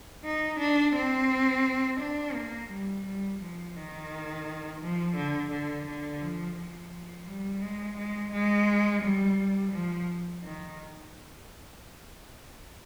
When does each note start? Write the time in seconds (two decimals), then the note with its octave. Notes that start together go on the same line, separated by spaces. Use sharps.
0.24 D#4
0.60 D4
0.95 C4
2.00 D4
2.34 A#3
2.70 G3
3.05 G3
3.41 F3
3.76 D#3
4.81 F3
5.16 D3
5.51 D3
5.87 D3
6.21 F3
6.56 F3
6.92 F3
7.27 G3
7.62 G#3
7.97 G#3
8.32 G#3
9.02 G3
9.72 F3
10.42 D#3